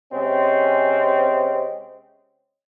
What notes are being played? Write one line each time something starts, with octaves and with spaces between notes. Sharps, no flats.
C3 G#3 C4 C#4